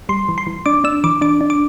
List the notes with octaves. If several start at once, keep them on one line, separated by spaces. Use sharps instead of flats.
G3 C6
E3
C6
E3
D4 D6
D4 E6
E3 D6
D4 D6
D4
D6